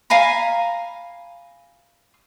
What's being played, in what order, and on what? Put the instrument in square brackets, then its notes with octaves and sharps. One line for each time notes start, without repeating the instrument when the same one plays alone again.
[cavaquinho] F5 G#5 A#5 B5